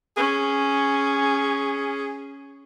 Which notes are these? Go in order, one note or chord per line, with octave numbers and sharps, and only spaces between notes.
C#4 G#4